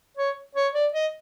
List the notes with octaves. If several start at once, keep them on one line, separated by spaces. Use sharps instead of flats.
C#5
C#5
D5
D#5